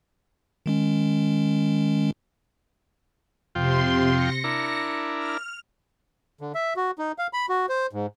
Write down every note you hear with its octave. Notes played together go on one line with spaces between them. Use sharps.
D#3 G#3 C#4
F2 C3 F4 G5 C6
A#6 C#7
D4 E4 A#4
F6
D3
E5
F#4
D#4
F5
B5
F#4
C5
G#2